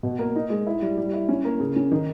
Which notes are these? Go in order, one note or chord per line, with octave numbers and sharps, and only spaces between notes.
B2
A#3
D#4
G#3
E4
G3
G3
E4
C#4
A#3
C#3
C#4
D#3